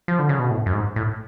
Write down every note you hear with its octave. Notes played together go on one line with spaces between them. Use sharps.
F3
D3
C#3
B2
A2
F#2
G#2
A2